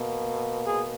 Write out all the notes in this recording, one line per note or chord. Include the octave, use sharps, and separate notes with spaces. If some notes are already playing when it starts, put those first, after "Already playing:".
Already playing: B2 A#3
G#4